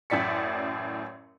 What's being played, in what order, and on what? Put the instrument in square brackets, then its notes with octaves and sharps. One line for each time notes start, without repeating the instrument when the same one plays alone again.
[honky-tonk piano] A1 F#2 A2 D5 B6 C#7